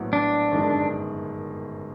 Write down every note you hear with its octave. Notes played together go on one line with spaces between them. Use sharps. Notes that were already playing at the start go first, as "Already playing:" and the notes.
Already playing: A#1 A2 F#3 B3
D4
G1 F#2 D#3 G#3